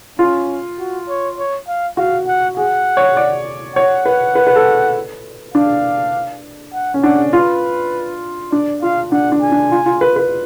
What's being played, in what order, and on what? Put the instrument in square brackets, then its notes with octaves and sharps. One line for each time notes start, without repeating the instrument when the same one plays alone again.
[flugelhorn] C#4 [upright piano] F4
[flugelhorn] F#4
C#5
C#5
F5
[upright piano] F#4 [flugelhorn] F5
[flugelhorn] F#5
[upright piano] G#4 [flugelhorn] F#5
[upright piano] C#5
D5
[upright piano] C#5 [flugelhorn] F#5
[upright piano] B4
B4
B4
A4
[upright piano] D4 [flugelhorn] F5
[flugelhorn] F#5
[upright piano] C#4
[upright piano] D4 [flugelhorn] F#5
[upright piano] F4 [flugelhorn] B4
[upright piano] D4 [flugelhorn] D5
[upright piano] F4 [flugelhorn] F5
[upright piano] D4 [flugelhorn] F#5
[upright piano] D4
[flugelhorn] G#5
[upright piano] D4
F4
F4
B4
B4